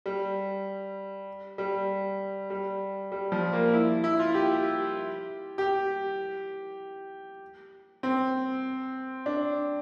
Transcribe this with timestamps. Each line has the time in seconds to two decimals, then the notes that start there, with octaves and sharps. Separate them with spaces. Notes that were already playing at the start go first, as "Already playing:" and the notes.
0.06 G3
1.58 G3
2.50 G3
3.12 G3
3.32 F3
3.53 A#3
3.73 E4
4.04 E4
4.19 F4
4.34 G4
5.58 G4
8.03 C4
9.26 D4